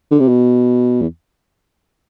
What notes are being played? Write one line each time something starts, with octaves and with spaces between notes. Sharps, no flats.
D3
C3
B2
E2